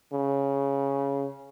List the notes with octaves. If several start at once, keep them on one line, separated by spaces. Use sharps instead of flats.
C#3